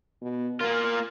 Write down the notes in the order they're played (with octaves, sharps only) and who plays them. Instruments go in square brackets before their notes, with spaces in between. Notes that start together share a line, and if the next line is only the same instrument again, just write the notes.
[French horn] B2
[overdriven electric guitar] A#3 F4 [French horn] A#4